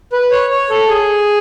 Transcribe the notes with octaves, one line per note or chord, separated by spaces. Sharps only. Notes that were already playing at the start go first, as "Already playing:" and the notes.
B4
C#5
C#5
A4
G#4